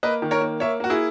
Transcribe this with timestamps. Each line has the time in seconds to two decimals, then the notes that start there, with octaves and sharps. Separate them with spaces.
0.03 A#3 B4 D#5
0.22 D#3
0.31 A#4 C#5
0.41 A#3
0.60 A#3 C#5 E5
0.80 A#3 F#4
0.90 E4 G#4